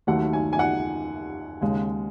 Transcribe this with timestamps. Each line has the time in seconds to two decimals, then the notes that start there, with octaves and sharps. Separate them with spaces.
0.07 D#2 D#3 F#3 A3 F#5
0.33 G#5
0.53 G#5
0.59 F#5
1.61 D#2 C#3 G#3